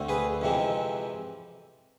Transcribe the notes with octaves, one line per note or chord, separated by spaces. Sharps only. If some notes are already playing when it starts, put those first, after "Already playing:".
Already playing: D2 D3 A3 C4
G#4 B4
F2 C3 E3 G#3 C4